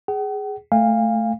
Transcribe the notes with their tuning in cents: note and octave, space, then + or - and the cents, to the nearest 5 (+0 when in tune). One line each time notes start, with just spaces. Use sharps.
G#4 +0 F#5 +45
A3 +0 F5 +0 G#5 -40